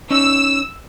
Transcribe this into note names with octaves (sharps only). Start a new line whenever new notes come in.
C#4 D#4 E6